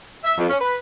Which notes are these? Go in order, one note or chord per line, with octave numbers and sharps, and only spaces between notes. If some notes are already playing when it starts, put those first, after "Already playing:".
E5
F2
C#4
B4